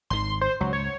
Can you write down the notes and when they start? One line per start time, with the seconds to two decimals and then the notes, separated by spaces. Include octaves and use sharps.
0.10 G#1 D#3 C6
0.41 C5
0.61 C#2 F#3
0.73 C#5